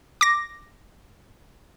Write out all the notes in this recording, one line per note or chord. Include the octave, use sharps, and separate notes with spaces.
D6 A#6